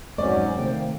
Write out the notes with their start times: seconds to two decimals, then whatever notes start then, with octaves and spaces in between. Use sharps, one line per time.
0.18 E1 F2 G#2 F#3 G#3 C#4 C5 D5
0.58 C3 D#3 A3 A#3 G5